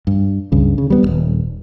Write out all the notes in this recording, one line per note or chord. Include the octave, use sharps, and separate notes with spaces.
G2
C#2 G2 C#3
C#3
G3 B3
D#1 D#2